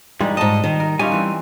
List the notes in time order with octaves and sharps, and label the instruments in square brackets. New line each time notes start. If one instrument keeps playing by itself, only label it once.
[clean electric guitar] G2 E3 G#3 [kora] G3 D#4
[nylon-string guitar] G#2 A5 [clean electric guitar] D#5
[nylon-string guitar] D#3
[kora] A#4
[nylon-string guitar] G3 [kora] C#4 D#4 F4 [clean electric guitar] G#5
[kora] E3 C4